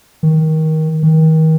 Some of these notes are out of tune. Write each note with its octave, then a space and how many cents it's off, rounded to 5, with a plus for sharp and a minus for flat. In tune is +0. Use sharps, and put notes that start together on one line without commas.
D#3 +20
D#3 +35